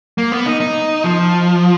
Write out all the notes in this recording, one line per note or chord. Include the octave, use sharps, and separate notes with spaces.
A#3
B3
D#4
D#4
F3